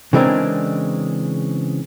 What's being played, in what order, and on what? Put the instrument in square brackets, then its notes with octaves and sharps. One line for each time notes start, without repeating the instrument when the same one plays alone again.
[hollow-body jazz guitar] C#3 E3 G#3 C4 D4 A#4